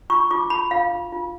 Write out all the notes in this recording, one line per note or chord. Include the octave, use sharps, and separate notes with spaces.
F4 C#6
F4 D6
F4 B5
F4 F5
F4
F4